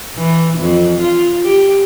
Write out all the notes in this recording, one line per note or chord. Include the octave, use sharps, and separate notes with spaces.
E3
F2
F4
G4